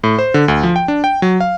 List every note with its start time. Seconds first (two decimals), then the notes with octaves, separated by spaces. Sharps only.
0.04 A2
0.19 C5
0.34 D3
0.48 D2
0.63 F3
0.76 G5
0.88 D4
1.04 G5
1.22 F#3
1.40 F5